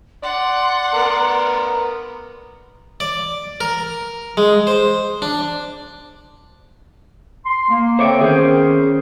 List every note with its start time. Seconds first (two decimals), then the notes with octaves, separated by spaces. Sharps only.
0.23 D5 F#5 C6
0.94 B3 A#4
3.00 D5
3.61 A#4
4.37 G#3
4.67 C5
5.22 D4
7.45 C6
7.69 A#3
7.99 D3 C4 C5 C#5 E5 D6
8.21 D#3 B3 C#4 G#4 C5